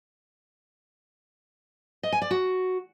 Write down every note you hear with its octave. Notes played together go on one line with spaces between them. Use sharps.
D#5
G#5
D5
F#4